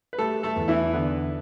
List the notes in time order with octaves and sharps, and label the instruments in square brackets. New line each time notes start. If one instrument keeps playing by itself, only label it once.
[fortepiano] B4
[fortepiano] A3 A4 [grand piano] G4
[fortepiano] A3 A4
[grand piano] E2
[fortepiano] E3 E4
[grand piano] D3 [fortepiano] B3